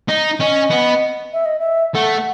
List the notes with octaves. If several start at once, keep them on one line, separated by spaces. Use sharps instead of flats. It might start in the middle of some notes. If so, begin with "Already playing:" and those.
D#4
C#4 D#5
B3
E5
D#5
E5
A3 F#5